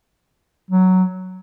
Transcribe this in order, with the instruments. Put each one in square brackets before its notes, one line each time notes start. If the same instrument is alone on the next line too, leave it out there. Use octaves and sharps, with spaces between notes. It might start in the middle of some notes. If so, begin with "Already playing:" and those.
[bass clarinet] F#3